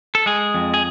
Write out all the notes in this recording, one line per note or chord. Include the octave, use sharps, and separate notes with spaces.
A4
G#3 G#4
F2
G#4